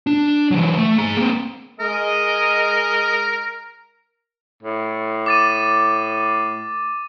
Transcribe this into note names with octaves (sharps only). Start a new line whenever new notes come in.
D4
E3 F#3
A3
G#4 A#5
A#3 C4
G#3 A#4 D#5
A2
D6 A6 D#7